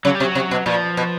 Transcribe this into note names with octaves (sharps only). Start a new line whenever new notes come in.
C#3 F#3
G3
C3
F#3
C3
B2
A#2 F3
B2